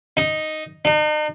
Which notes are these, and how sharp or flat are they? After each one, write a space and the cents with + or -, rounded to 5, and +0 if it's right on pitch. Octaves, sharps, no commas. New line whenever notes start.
D#4 +0
D#4 -40